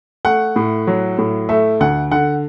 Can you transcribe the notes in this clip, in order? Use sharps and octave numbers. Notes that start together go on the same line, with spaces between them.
A3 F#5
A2
F#3
A2
A3 E5
D2 F#5
D3 F#5